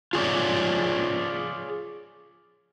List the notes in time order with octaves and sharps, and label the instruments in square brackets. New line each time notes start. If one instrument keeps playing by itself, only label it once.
[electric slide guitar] F4 G#4 C#5 D5